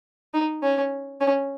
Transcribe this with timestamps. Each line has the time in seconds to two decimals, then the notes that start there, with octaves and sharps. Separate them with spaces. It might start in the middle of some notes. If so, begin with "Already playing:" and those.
0.34 D#4
0.63 C#4
1.21 C#4